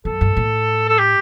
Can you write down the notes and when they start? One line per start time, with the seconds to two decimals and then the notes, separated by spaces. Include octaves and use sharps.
0.05 F#2 A4
0.21 G2
0.37 A2
0.89 A4
0.99 G4